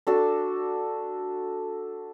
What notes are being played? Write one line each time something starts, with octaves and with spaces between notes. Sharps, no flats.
D4 F#4 A4